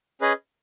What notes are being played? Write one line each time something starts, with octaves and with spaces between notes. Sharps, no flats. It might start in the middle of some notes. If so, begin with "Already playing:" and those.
C#4 G#4 B4 D#5